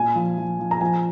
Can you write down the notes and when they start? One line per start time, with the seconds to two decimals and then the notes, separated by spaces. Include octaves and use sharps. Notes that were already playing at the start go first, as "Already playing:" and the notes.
Already playing: A#2 G#5
0.15 F3
0.38 F3
0.59 F3
0.71 A#5
0.81 F3 G#5